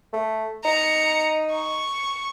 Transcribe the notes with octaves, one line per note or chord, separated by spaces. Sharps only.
A3
D#4 A#5 C#7
C#6